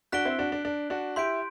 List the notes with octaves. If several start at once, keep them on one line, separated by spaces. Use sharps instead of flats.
D4 F#4 F#6 B6 D7 G7
C4 E4
D4 F#4
D4
D4
D4 F#4
E4 G4 C6 G6 D7